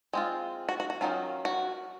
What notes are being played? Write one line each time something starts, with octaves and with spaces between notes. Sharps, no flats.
G#3 C4 F4
F#4
F#4
F#4
D#3 F#3 C#4 F4
F#4